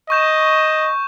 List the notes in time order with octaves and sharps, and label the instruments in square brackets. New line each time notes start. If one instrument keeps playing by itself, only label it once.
[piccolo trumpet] D#5 [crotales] C#6 G6 E7